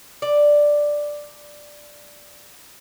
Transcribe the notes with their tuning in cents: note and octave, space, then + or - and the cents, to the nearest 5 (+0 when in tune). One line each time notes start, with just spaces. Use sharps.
D5 +5